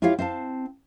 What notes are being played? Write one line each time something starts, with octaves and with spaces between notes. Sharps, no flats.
E4 F4 G4 C#5 F5
C4 E5 F5 A5